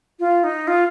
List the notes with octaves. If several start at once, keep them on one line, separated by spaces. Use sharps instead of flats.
F4
D#4
F4